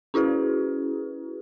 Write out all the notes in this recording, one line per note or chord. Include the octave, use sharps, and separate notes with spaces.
C#4 E4 F#4 G#4 B4